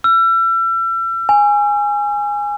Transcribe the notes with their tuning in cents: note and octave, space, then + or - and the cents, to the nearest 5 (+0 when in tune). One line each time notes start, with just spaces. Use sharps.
E6 +40
G#5 -10